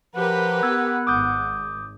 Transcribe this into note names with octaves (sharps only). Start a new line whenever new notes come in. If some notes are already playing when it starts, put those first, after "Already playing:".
F3 G4 A#4 B4 F#5
B3 E6 G#6
G#1 D6 D#6 G6